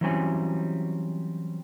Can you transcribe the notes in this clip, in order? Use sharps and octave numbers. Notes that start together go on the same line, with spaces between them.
E3 F#3 G3 C4 C#4 G#5